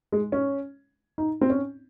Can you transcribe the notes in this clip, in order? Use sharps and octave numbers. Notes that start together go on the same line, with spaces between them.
G#3
C#4
D#4
C4
C#4